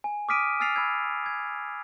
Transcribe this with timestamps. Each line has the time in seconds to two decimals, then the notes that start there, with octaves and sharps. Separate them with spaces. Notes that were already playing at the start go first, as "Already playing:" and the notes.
0.04 G#5
0.29 D6 D#6 F6 B6 D7 D#7
0.60 G#5 E6 F6 A6 C7 F7
0.76 B5 E6 G#6
1.26 G#6